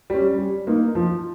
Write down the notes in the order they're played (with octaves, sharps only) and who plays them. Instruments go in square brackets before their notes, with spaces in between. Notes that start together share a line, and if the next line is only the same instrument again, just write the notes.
[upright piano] G3 C#4
G3
A#3 D#4
F3